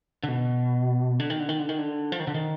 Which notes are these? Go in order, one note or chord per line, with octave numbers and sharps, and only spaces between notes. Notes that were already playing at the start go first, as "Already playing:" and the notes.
D3
B2
D3
D#3
D3
D#3
D3
D#3
D3
F3
D#3
D3
D#3